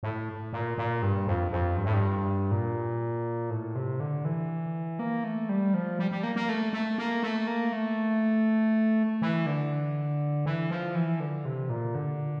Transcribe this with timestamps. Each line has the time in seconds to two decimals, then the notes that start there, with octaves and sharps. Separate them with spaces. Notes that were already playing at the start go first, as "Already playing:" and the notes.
0.03 A2
0.53 A#2
0.78 A#2
1.02 G2
1.27 F2
1.52 F2
1.77 G2
1.85 A2
1.94 G2
2.51 A#2
3.50 A2
3.75 C3
4.00 D3
4.25 E3
4.99 A#3
5.24 A3
5.49 G3
5.74 F3
5.99 G3
6.11 G3
6.23 A#3
6.36 A#3
6.49 A3
6.73 A3
6.98 A#3
7.23 A3
7.47 A#3
7.72 A3
9.22 E3
9.46 D3
10.46 E3
10.71 F3
10.95 E3
11.20 D3
11.45 C3
11.70 A#2
11.95 D3